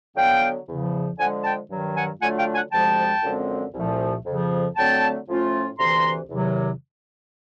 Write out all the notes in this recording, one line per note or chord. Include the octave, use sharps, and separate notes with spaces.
D3 F#3 B3 F5 G5
E2 C#3 F3
D3 F3 G#3 F#5 G#5
G5 A5
G2 D#3 F#3
F#5 G#5
D3 F#3 A3 D4 F4 F#5 G#5
F5 G5
F#5 G#5
D2 C3 F3 G#3 G5 A5
F#2 D3 F3 G#3 C4
C2 A#2 F3 A3
F2 C#3 F3
D3 F#3 A3 C4 G5 A5
A2 F3 A3 C#4 F4
D2 C3 E3 A#5 C6
E2 C3 D#3 F#3